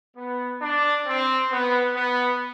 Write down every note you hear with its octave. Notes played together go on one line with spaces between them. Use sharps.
B3
D4
C4
B3
B3